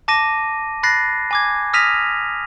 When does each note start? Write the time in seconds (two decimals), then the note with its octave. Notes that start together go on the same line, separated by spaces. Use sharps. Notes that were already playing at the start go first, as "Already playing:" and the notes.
0.08 A5 D6 A#6 D#7
0.83 B5 F#6 A6 A#6 C7
1.31 G#5 D6 G#6
1.73 D#6 F6 A#6 B6 D#7 F7